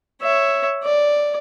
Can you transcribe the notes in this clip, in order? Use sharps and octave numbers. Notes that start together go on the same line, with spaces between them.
C#5 E5
D5